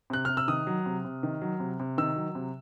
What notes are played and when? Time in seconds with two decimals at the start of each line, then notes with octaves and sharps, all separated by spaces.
0.10 C3 F#6
0.25 C3 F6
0.37 E6
0.48 D#3 D#6
0.67 F#3
0.86 C3
1.05 C3
1.23 D#3
1.42 F#3
1.60 C3
1.80 C3
1.98 D#3 E6
2.16 F#3
2.35 C3